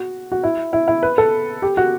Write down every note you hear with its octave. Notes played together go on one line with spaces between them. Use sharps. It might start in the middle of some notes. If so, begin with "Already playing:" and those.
Already playing: F#4
F#4
E4
E4
E4
B4
A4
G4
F#4